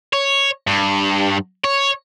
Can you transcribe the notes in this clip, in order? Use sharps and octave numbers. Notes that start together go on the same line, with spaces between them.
C#5
G2
C#5